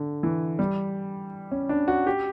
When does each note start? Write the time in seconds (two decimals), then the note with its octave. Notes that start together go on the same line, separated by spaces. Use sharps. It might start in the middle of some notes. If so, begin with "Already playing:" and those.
Already playing: D3
0.23 E3
0.59 G3
1.51 C#4
1.69 D4
1.88 F#4
2.07 G4